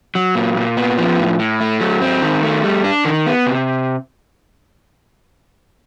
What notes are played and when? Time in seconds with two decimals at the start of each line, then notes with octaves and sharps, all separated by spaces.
0.15 F#3
0.35 A#2
0.56 A#2
0.77 B3
0.98 F3
1.18 A2
1.39 A2
1.60 A3
1.80 F#3
2.02 C4
2.22 D#3
2.43 A3
2.64 G3
2.84 D4
3.05 D#3
3.27 B3
3.47 C3